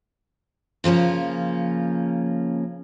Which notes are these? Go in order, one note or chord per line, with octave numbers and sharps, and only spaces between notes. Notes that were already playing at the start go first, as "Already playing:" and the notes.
C#3 F3 A#3 C#4